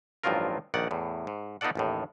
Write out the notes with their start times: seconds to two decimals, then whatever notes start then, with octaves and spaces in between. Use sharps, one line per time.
0.24 A1 G2 F3 F#3 F4 A#4
0.74 A#1 D#3 D5 F#5
0.91 E2 A2
1.27 G#2
1.61 B3 D#4 F4 A4 D5 F#5
1.75 A1 D#2 A2